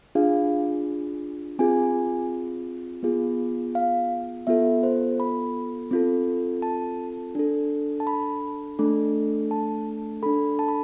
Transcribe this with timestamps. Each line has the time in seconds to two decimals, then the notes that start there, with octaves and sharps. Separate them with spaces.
0.15 D4 F4 G#4 F5
1.59 C4 F4 G#4 G#5
3.03 B3 F4 G#4
3.75 F5
4.47 B3 F4 A4 E5
4.83 C5
5.20 B5
5.91 C4 F4 A4
6.62 A5
7.35 D4 A4
8.00 A5
8.07 B5
8.79 A3 D4 A4
9.51 A5
10.23 D4 A4 B5
10.59 A5
10.68 B5